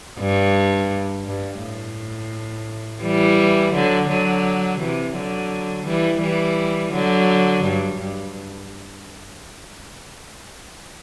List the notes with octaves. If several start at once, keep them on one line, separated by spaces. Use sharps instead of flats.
G2
G2
A2
E3 G3
D3 F#3
D3 F#3
C3 E3
D3 F#3
E3 G3
E3 G3
D3 F#3
G2
G2